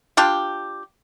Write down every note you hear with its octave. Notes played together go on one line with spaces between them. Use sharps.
D4 F4 G4